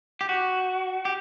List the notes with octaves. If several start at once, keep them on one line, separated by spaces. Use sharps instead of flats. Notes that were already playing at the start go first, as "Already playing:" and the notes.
G4
F#4
G4